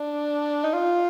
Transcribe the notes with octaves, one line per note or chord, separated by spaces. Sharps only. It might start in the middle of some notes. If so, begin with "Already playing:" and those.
Already playing: D4
D#4
F4